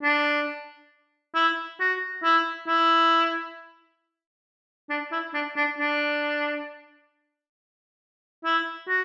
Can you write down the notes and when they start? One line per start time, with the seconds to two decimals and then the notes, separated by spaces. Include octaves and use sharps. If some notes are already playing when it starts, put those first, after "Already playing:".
0.03 D4
1.35 E4
1.80 F#4
2.24 E4
2.68 E4
4.90 D4
5.12 E4
5.34 D4
5.56 D4
5.78 D4
8.45 E4
8.88 F#4